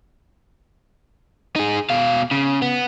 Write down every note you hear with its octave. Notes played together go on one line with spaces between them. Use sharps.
D#4 G#4
B2 F5
C#3
B3